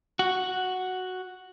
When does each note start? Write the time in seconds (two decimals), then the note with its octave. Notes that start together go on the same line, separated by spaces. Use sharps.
0.19 F#4